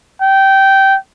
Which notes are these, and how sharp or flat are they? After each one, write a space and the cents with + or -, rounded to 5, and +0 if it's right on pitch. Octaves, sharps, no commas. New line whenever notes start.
G5 -15